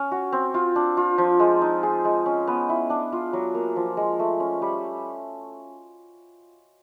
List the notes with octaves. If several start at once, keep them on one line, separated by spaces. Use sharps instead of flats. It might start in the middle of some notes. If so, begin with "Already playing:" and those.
Already playing: C#4
F#4
C4
F4
D4
F4
F3
G#3
D#4
G#4
G#3
C#4
B3
E4
D4
F4
F#3
A#3
F3
G#3
A3
C#4
G3